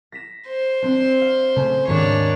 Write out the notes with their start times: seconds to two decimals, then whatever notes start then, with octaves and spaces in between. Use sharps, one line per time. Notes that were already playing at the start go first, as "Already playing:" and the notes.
0.12 A#6 B6 E7
0.49 C5
0.82 C4 D4
1.21 F5
1.56 C#3 A3 C#4
1.87 D#2 G#2 D4 C#5